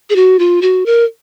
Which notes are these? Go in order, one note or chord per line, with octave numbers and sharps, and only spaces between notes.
G#4
F#4
F4
F#4
A#4